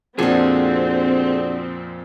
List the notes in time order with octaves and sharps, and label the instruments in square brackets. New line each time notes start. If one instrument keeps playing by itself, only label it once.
[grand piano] F2 A#2 F3 [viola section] C4 [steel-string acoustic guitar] D4 F#4 [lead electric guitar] G#4 A4